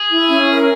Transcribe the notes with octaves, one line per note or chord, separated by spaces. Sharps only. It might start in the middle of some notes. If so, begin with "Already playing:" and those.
Already playing: G#4
E4
C#4
A#4